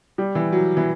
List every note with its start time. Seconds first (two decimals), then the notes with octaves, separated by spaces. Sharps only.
0.18 G3
0.35 E3
0.52 F#3
0.77 E3